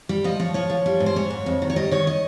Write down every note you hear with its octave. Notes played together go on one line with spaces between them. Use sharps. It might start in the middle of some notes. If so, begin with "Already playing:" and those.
G3
F3 D#5
F3 C#5
F3 C#5
F3
G3
G#2
C5
G#2 C#5
G#2
F2
D#3
C#5
G3 D#5
D#3 C#5
D#5